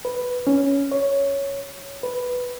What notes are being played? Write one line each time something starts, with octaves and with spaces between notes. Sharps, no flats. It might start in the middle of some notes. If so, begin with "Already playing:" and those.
B4
C#4
C#5
B4